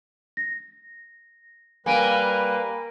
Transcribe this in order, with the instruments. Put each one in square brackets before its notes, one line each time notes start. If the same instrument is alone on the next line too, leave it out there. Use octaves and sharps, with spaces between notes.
[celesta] A#6
[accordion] G3 B4 [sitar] A#3 [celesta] G#5 D7 D#7